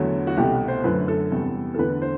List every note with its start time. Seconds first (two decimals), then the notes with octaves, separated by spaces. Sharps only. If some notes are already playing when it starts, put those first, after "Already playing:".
Already playing: E2 D3 F#3 A3
0.27 F#4
0.37 C2 B2 A3 G4
0.68 C5
0.84 F#2 D3 A3 B4
1.08 A4
1.31 E2 C3 G3
1.74 A4
1.78 E2 D3 A3 B4
2.02 C5